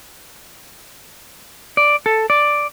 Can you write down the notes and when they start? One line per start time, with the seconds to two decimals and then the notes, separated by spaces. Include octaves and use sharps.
1.77 D5
2.06 A4
2.30 D5